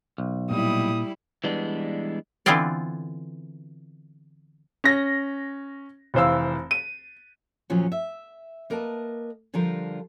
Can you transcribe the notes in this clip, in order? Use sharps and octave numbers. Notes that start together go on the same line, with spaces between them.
B1
A#2 G3 E4 D#6
E3 G3 G#3 B3 D4
D3 E3 B3 C4 F4 D5
C#4 A#6
F1 E3 C5 F5 E6
D#7
D#2 A#2 F3 F#3 C#4
E5
A#3 A#4 B4 D#5 A5
D3 F3 G3 F4 A#4